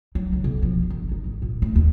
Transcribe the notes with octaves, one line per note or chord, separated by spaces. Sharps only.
F#3
C#2
B1
F3
G1
D#4
G#1
A#2
A3
D#2